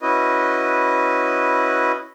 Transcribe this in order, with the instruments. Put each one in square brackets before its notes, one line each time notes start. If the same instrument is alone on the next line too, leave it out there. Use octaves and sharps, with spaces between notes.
[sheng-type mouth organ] C#4 E4 F#4 B4 D#5